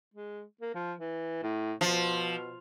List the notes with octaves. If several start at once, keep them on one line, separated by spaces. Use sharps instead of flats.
G#3
A#3
F3
E3
A2
B2 F3